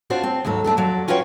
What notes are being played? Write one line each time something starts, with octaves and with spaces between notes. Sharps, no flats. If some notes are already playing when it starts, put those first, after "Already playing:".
C4 D4 F4 F#4 C5
C4
D#2 G#2 F#3 A4
F#2 A3 D4 A4
F2 F#3 D5
C#4 F4 F#4 B4 C#5 G5